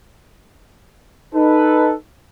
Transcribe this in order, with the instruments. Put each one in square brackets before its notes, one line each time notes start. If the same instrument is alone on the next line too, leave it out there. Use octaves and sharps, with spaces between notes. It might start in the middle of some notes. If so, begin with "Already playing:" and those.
[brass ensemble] D#4 A4 B4